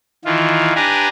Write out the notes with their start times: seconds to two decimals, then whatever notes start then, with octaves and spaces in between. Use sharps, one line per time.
0.25 D#3 E3 F4
0.75 D4 G4 B4 G#5 A#5